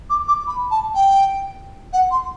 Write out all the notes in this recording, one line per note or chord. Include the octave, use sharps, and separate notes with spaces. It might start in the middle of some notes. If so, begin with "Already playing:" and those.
D6
D6
B5
A5
G5
F#5
C6